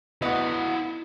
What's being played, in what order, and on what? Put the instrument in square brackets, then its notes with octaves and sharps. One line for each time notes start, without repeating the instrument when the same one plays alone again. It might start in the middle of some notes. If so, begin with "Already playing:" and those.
[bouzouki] B3 F#4 [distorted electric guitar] E4 D#5